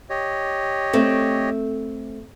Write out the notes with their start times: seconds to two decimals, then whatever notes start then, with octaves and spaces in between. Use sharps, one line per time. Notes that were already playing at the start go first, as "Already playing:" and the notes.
0.10 G4 C#5 D#5
0.93 A3 C4